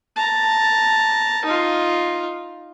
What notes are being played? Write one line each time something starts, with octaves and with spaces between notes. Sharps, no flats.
A5 A#5
D#4 F4